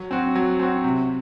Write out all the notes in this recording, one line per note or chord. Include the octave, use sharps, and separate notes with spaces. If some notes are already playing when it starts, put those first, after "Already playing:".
Already playing: F#3
C4 F#4
F#3
C4 F#4
C3